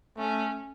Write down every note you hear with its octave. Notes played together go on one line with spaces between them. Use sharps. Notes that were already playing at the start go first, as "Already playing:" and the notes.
A3 C#4